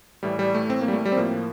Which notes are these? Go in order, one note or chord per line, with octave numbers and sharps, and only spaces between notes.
A2 E3 G3
G3
A3
C4
A#3
G3
A3
G3
C4
A2 F3 A#3